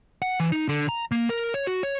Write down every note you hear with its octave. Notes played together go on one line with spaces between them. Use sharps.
F#5
E3
D#4
D3
A#5
A#3
A#4
C#5
F#4
C#5